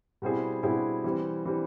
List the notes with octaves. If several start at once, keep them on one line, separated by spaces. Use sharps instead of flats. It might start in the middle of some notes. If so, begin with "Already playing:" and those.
B2 G3 C4 E4 G#4
B2 G3 C4 E4 G#4
E3 G3 C4
E3 G3 C4